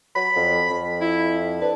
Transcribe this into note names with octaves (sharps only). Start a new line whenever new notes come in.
F#3 B5
F2
F2
E4
D4 B4